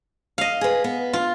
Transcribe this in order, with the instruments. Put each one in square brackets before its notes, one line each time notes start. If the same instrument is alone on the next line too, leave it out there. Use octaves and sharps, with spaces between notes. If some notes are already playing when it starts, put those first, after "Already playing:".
[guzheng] D#5 F5
[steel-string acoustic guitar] G#4 B4
B3
[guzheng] F4